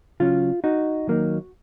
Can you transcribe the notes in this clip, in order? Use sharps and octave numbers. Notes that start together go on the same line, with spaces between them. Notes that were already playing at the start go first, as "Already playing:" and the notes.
C#3 F#3 C#4 F4
D#4 F#4
D#3 F#3 A#3 D#4